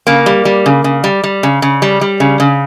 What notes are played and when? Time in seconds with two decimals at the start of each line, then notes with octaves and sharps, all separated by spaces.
0.07 C#3 A#3
0.26 G3
0.45 G3
0.66 C#3
0.84 C#3
1.04 G3
1.24 G3
1.43 C#3
1.62 C#3
1.82 G3
2.01 G3
2.20 C#3
2.40 C#3